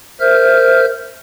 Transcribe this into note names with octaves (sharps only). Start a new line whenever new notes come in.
A#4 C5 E5 F6 G6